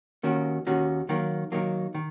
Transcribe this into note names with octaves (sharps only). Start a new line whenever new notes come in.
D#2 D#3 A#3 C#4 F#4
D#2 D#3 A#3 C#4 F#4
D#3 F#3 A#3
D#3 F#3 A#3
D#3